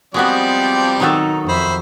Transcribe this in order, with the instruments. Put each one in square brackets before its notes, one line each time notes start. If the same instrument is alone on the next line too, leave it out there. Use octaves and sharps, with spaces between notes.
[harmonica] F3 G3 D5 [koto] G#3 B3 F#4 [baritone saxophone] C4
[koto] D#3 F#3 A4 [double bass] D#4
[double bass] F2 [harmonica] C5 E5 B5